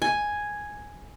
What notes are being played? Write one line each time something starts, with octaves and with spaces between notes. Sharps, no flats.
G#5